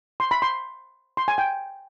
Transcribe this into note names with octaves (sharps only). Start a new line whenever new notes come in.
C6
B5
C6
C6
G#5
G5